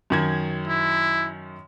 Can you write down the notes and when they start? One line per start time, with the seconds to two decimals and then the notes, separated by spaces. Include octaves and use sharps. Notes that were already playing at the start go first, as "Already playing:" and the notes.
0.10 F#2 D#3 G#6
0.67 E4